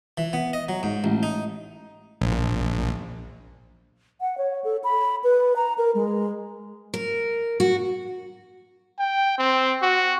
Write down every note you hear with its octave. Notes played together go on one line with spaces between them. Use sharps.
E3
B3
D#5
F#3
G#2
A1
D#4
A#1
F#5
C#5
A4
B5
B4
A#5
A#4
G#3
A#4
F#4
G5
C4
F#4